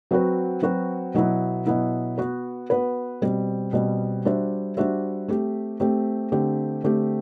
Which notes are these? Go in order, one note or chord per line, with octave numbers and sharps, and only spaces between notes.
F#3 C4 F#4 B4
F#3 C4 F#4 B4
B2 F#3 B3 E4
B2 F#3 B3 E4
B3 F#4 B4
B3 F#4 B4
B2 G3 C4
B2 G3 C4
G3 D4 F#4 C5 E5
G3 D4 F#4 C5 E5
A3 C4 G4
A3 C4 G4
D3 A3 C4 G4
D3 A3 C4 G4